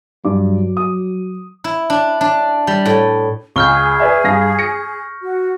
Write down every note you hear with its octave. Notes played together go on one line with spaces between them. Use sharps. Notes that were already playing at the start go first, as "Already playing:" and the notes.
G2 F#3 D6
D#6
E4
D4
D4
G3
A2
C#2 G#4 C#6 F6 G6 G7
B4 D5 E5
G2 F5 A#6
A#6 C#7
F#4